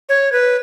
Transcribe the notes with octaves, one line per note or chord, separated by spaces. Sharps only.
C#5
B4